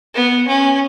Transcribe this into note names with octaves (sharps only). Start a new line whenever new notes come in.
B3
C#4